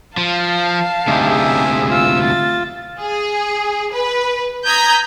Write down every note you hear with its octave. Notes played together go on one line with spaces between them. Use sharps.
F3 F5 A5
D2 C3 D#4 G4 G#4 E5
F4 E6
A6
G#4
B4
A#5 D#6 G6 G#6 B6